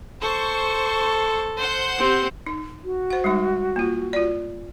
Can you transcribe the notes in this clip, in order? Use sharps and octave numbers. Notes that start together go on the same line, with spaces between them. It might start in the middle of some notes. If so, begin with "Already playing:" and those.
A4 C5 C#6
C5 F#5 G6
C4 G4
D#4
F#4
C5 F#5
G3 G#3 D#4
A#3 F4
F4 D5